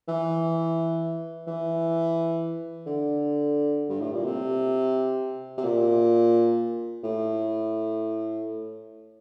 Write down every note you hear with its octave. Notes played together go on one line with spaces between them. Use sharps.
E3
E3
D3
G2
A2
A#2
C3
C3
A#2
A2